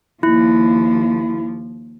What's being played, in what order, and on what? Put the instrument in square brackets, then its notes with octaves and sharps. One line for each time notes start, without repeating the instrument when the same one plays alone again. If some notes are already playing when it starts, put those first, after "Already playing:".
[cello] D#2 F3 [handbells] E4